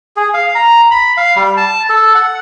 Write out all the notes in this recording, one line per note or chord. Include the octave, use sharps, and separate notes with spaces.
G#4
F5
A#5
B5
F5
G3
A5
A4
F#5